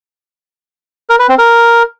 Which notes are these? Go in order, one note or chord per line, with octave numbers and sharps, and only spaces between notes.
A#4
B4
C4
A#4